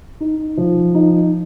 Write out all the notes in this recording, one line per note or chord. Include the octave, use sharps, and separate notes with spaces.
D#4
F3
D#4